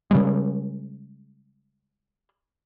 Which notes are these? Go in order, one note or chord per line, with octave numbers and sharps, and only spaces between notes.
C#3 G3 G#3